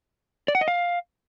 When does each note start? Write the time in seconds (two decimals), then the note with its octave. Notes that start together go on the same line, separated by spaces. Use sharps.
0.48 D5
0.55 F#5
0.61 D#5
0.68 F5